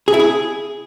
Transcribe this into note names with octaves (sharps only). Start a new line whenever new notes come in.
G#4
E4
G#4